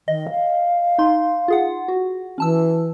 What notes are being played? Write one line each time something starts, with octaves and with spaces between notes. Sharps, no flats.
D#3 D#5
F5
D#4 C6
F4 G#4 F#5
F#4
E3 C#4 A5 E6